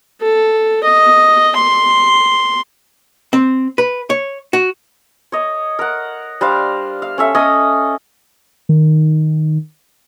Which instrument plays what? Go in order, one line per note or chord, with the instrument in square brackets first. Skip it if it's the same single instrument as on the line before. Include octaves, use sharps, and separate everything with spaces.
[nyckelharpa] A4
D#5
C6
[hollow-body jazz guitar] C4
B4
C#5
F#4
[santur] C#5 D#5
A#4 F#5
G3 D4 C5 F5
F5
C#4 A4 E5
C#4 D#5 D#6
[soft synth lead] D#3